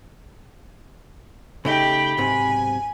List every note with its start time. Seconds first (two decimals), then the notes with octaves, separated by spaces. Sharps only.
1.65 C#3 A3 D#4 G4 G5 B5
2.17 B1 G#2 C3 G#5